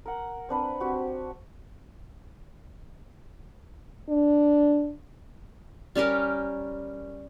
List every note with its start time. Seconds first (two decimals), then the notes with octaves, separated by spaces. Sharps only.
0.06 A#4 F#5
0.49 C4 D4 B4
0.80 C4 F#4 G4
4.09 D4
5.95 G3 C#4 G4 A#4